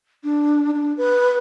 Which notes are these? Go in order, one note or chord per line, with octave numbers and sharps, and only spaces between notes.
D4
D4
B4